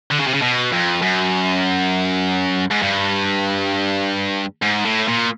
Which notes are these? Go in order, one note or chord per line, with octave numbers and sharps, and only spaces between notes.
D3
C#3
C3
C#3
B2
F2
F#2
G#2
G2
G#2
A2
A#2